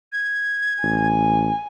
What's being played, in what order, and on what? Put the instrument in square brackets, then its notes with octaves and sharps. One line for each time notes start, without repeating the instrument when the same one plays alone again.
[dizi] G#6
[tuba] A1 [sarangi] G#5